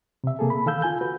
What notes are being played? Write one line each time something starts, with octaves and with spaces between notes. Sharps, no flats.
C3 E5
C3 A#3 G#4 A4
B5
D#3 A4 F5 E6 G6
F4 G#5 G6
F#4 B4